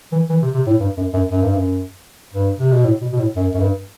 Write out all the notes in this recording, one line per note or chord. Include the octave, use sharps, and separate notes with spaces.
E3
E3
C3
C3
A2
G2
F#2
F#2
F#2
G2
F#2
G2
C3
B2
A2
B2
B2
A2
F#2
F#2
G2